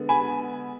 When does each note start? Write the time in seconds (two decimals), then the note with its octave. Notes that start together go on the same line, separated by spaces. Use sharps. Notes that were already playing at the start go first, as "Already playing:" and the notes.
Already playing: D3 G#3 B3
0.09 G#5 B5